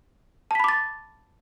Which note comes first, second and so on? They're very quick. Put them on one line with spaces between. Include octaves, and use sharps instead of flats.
A5 B6 B5 D6 A6